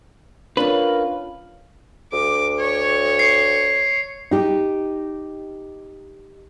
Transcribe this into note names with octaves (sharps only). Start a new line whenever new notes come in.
C#4 D4 F4 A#4 B4
D2 D6
C#5
C7
D#4 G4